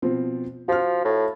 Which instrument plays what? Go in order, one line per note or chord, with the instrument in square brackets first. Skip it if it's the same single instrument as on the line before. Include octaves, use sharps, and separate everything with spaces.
[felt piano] B2 F3 C4
[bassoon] F3 [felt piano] F#4 F6
[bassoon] A2